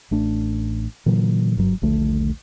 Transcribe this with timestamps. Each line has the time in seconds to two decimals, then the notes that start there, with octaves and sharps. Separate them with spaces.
0.11 A1 A3 D4
1.06 A#2 D3 E3 F#3
1.57 F#1 G2 F#3
1.82 D#1 A#1 D3 A3